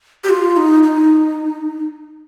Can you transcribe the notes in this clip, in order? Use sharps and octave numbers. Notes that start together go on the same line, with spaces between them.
G4
F4
D#4
D#4